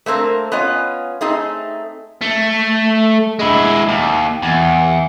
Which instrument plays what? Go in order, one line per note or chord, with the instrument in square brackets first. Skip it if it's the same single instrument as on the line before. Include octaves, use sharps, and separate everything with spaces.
[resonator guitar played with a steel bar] A3 A#3 C4 A#4
B3 C#4 F4 D#5
A3 C4 D#4 G#4
[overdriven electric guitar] A3
G#3 E4
D#2
E2